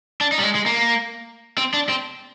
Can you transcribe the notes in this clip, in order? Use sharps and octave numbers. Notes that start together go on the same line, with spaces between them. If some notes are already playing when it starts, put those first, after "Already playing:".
D4
D#4
G3
G#3
G#3
A#3
C4
D4
C4